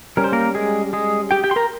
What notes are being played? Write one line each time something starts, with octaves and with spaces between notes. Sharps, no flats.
G3 C#4 A#4
C5
A#3 A#4
G#3 G#4
G#3 G#4
G4 G5
G4 G5
C6
A#4 A#5